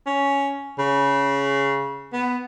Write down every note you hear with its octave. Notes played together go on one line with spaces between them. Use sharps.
C#4
C#3
B3